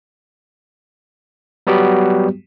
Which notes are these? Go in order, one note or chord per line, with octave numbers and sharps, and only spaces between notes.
F#3 G3 B3 F#4 G4